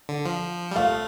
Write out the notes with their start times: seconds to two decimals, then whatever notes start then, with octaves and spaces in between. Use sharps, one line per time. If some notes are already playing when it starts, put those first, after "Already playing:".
0.09 D3
0.26 F3
0.71 G3
0.76 A3 F5